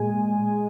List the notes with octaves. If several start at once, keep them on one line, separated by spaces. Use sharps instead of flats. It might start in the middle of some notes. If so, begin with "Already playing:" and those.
Already playing: A#2 G#3 G#5